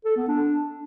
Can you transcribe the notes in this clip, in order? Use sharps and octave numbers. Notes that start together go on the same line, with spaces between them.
A4
B3
D4